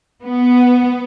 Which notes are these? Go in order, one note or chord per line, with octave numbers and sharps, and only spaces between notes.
B3